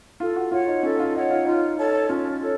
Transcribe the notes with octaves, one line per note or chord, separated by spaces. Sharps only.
F4 A4
F#4
F4 C#5 F#5
D#4
C#4 A4
F4
D#4 C#5 F#5
F4
D#4 F4
A4 C#5 A5
C#4 F4
A4 C#5